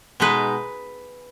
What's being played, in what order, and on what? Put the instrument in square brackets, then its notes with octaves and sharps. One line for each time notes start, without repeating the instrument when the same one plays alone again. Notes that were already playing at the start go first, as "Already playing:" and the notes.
[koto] B2 G#3 D#4 B4